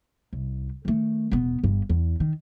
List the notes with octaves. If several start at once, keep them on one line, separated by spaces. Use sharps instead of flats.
C2
D#3 A3
E1 B3
G1 G2
E2
D#3